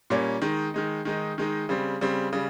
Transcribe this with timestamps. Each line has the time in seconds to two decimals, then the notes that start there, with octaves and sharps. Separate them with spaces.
0.10 A#2 G3 A#3 C#4
0.42 D#3 G#3 D#4
0.74 D#3 G#3 D#4
1.05 D#3 G#3 D#4
1.38 D#3 G#3 D#4
1.69 C#3 G3 C4
2.01 C#3 G3 C4
2.33 C#3 G3